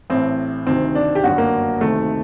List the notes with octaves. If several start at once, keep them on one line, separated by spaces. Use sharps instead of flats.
A1 A2 C4
D2 C3 D#3 C4
D4
G4
G1 F#2 D3 F#4
A#3
D2 C3 D#3 A3